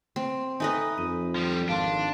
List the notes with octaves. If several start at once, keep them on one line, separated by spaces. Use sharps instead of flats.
C4
D#4 A4 B4 D#5 E5 G#5
F2 D#7
F3 G3
G#1 D4 F5 A5 C6